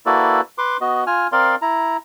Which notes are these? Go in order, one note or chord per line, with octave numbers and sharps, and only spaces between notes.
A#3 E4 F#4 A4 B4 D5
B4 C6 D6
B3 F#4 D#5
F4 G#5 F6
C4 A#4 D5 F5 C6
E4 A#5